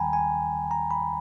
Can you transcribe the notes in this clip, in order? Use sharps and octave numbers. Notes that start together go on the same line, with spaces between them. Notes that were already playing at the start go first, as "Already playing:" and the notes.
Already playing: D#2 D#3 G3 G5 G#5 A#5 B5
G#5
A#5
B5